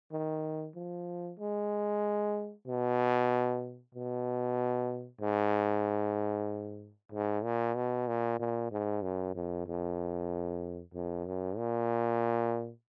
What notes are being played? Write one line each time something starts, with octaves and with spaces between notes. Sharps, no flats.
D#3
F3
G#3
B2
B2
G#2
G#2
A#2
B2
A#2
A#2
G#2
F#2
F2
F2
F2
F#2
A#2